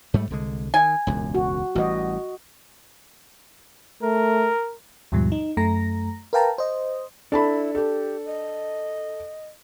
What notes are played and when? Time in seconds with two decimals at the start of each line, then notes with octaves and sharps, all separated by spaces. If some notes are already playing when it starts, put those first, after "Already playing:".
0.14 G#2 G3 A3
0.30 C2 D3 G#3
0.74 D#3 G#5
1.07 E1 C#2 F#2
1.35 F#4
1.75 A1 E3 G3 F#4 D#5
4.03 A3 A#4
5.12 D#2 G#2 B2 F3 G3
5.32 D#4
5.57 F#2 A3 A#5 A#6
6.33 A#4 B4 F5 G5 A5 A#5
6.58 C5 D#5
7.32 D4 E4 A4 A5 B5
7.75 G4 A4
8.25 D#5